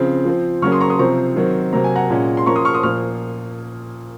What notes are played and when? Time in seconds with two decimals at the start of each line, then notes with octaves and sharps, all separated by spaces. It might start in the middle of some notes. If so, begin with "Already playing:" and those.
Already playing: C#3 F3 C4
0.25 F3 C4
0.62 C#3 F#3 A#3 C#4 C#6 F6
0.72 C6 D#6
0.81 A#5 C#6
0.90 C6 D#6
0.99 C3 F3 C4 A#5 C#6
1.36 D#3 F#3 C4
1.72 C3 F#3 A#3 A#5
1.84 G#5
1.96 F#5 A#5
2.10 A#2 G#3 C#4
2.37 C6
2.46 F3 A#3 C#4 A#5 C#6
2.56 C6 D#6
2.65 C#6 F6
2.74 C6 D#6
2.83 A#2 F3 A#3 C#6 F6